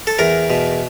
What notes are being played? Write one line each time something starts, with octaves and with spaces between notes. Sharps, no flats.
A4
E2 A#4
B2